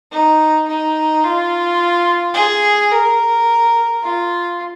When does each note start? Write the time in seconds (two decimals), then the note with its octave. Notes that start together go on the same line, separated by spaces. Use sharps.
0.12 D#4
0.68 D#4
1.24 F4
2.35 G#4
2.92 A#4
4.03 F4